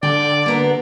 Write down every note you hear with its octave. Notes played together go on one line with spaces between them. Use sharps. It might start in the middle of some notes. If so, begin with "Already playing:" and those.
D3 D5 G5
A#3 B3 F#4